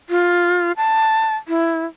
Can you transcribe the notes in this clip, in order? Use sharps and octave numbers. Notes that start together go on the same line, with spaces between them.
F4
A5
E4